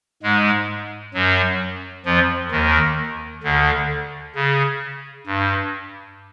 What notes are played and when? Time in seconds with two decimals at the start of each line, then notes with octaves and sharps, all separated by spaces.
0.23 G#2 G#3
1.14 F#2 F#3
2.06 F2 F3
2.51 D#2 D#3
3.43 D2 D3
4.35 C#3
5.26 G2